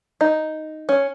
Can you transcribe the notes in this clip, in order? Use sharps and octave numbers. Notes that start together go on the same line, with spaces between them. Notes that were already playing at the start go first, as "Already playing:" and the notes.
D#4
C#4